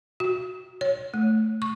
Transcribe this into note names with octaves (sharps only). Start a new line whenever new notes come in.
F#4
C#5
A3
C#6